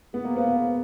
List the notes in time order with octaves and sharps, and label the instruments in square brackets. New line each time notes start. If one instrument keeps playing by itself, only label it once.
[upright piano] B3 [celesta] G#4
[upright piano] A#3
[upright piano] B3 [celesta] C5 F5
[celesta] G#4